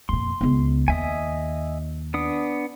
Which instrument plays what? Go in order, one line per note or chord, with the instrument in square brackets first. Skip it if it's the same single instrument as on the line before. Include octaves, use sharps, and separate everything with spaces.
[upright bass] F2 A#2 [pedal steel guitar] C6
[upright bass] C#2 B3
[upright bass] D#2 [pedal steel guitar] D#5 E5 G#5
[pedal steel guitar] B3 D4 D#6